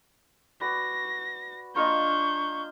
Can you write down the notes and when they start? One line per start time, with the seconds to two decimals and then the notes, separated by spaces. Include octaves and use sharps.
0.61 F#4 B4 D5 A#6
1.76 A#3 D4 F4 D#5 C#6 G6